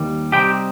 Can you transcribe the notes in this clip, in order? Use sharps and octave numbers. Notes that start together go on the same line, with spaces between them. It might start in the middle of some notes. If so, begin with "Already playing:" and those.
Already playing: D#2 D#3 G3
C3 D#3 G3 C4 D#4 G4 G5